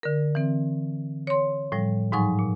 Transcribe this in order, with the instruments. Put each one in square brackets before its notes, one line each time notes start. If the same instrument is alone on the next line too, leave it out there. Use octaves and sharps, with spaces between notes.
[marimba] D3 A#4
E3 C4
C#5 C6
A2 F3 G3
G#2 F3 F#3 D#4 G#5 C#6
A#2